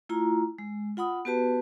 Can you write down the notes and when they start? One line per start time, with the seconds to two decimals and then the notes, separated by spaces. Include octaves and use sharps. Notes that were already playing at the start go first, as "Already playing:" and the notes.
0.09 A3 E4 F4 A#5
0.59 G#3
0.97 F4 F#5 B5 D#6
1.25 B3 F#4 G4 B4 A5